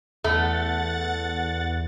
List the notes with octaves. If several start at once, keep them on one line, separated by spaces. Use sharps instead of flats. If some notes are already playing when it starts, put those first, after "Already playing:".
E2 A3 F#5 A6